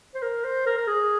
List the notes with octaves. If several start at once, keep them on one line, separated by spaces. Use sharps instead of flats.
C5
A#4
C5
A#4
A#4
G#4